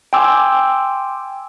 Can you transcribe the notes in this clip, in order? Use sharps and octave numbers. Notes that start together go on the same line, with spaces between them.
G5 G#5 C6 D6 E6